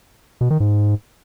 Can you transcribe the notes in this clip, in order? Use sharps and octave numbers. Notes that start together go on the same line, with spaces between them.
B2
D#3
G#2